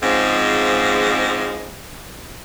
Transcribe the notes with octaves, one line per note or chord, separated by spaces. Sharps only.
G#2 C#3 F3 G#3 C4